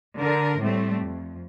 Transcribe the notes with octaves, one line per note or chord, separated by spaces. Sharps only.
D3 A#4
A2 G3 A3 C4
F2